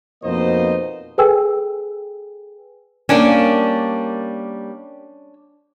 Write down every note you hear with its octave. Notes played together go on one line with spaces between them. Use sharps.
F2 B2 A#3 D#4 C5 D#5
G#4 A4 B4 G5 G#5 E6
G3 A#3 C#4 D4